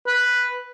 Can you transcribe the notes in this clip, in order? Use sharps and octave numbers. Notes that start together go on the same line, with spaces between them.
B4